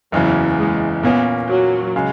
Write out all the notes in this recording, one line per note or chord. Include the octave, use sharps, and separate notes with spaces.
F#1 E2 C#3 E3 F#3
G#3
A#2 A#3 B3 C#4
F#3
C#3 G#3